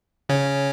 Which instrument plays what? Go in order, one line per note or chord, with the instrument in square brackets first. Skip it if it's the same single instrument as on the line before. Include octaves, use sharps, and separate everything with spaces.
[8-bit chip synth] C#3 C#4